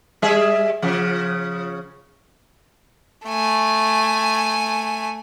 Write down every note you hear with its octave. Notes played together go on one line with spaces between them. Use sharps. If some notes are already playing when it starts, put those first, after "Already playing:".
G3 G#4 E5
C#3 F3
A3 G#5